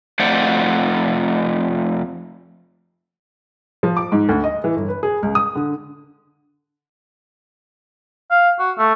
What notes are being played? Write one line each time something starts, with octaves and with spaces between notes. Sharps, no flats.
F2 A3 C5 D5 F#5
F3
D6
G#2
D2
D#5
E3
G1
B4
G#4
C#2
D#6
D3
F5
F#4
A3